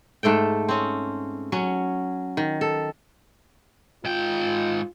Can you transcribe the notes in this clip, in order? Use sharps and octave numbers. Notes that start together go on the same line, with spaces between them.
G#2 A3 A4 G5
C4 C#4
F#3 C#4
D#3
A4
G#2 F4 G5